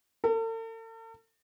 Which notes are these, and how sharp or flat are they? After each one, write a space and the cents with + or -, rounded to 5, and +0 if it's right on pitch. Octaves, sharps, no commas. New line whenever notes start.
A4 +45